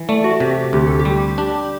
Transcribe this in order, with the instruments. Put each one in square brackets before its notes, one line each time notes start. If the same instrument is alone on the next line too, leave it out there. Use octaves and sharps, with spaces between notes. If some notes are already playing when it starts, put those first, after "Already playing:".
Already playing: [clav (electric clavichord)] E3
[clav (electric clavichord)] A3 [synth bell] D5
[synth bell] F#4
[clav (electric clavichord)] C3 [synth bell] G4
[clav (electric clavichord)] D2 [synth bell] G4
[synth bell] A4
G4
[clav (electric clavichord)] G3
D4